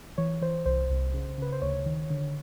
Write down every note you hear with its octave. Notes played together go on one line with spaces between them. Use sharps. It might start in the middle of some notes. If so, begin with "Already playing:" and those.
E3 C#5
E3 C5
C2 C5
C2
C#3
C#3 B4
C5
D2 C#5
D#3
D3